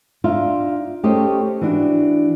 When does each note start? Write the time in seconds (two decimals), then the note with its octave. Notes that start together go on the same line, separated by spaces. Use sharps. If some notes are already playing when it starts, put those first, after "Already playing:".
0.24 D4 D#4 F4 E5
1.03 A3 C#4 D#4 G4 C5 D#5
1.61 E3 D4 F#4